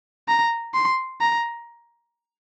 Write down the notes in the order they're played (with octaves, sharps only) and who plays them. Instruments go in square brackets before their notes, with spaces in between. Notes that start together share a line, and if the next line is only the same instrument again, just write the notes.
[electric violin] A#5
C6
A#5